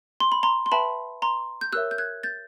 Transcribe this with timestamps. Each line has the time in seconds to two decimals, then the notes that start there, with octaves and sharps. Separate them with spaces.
0.20 C6
0.32 B5
0.43 A#5 C6
0.66 C6
0.72 B4 E5 G5 A5 B5
1.22 A#5 C6
1.61 G6
1.72 G4 A#4 C#5 E5 E6 F#6
1.91 G6
1.98 F#6 G#6
2.23 G6 A6